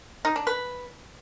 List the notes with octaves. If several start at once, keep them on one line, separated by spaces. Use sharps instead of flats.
D#4
D4
B4